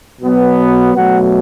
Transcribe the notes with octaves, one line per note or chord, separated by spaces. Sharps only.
B2 F#3 B3
B2 F#3 A3 F#5